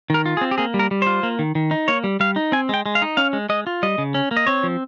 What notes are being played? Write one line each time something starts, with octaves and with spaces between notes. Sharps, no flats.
D#3 A#4
F4
G#4
C4
G4
A#3 G#4
G3
A#4
G3
F4 C5
A#3
D#3
D#3
D#4
A#3 C#5
G3
G3 F5
D#4
C4 G#5
G#3 G5
G#3
F5
D#4
C#4 F5
G#3
G#3 D#5
F4
G3 D#5
C#3
C#4
A#3
D#5
C4 C#5
F3